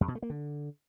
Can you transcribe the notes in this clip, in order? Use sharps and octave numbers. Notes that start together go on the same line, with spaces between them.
F2
B2
A3
A#3
D3